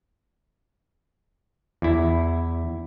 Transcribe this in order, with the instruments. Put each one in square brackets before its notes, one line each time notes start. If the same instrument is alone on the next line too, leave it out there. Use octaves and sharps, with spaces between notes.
[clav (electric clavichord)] E2 E4